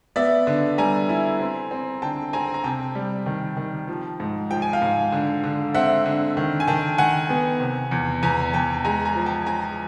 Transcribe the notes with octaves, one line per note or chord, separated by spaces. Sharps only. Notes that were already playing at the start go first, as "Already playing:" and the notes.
B3 D5 E5
D3
G3 G#5 A#5
E4
C4
C4
D3 G5 A5
C4 G#5 A#5
A#5
C3 G5 A5
G3
D#3
D#3
F3
G#2
F3 G5
G#5
F5 G5
G#2
D3
D3
C4 E5 F#5
D3
D#3
G#5
D#3 G5 A5
D#3 F#5 G#5
B3
C3
E2
E2 G#5 A#5
E2 G5 A5
G#3 G#5 A#5
G#5 A#5
F3
G5 A5
F3 G#5 A#5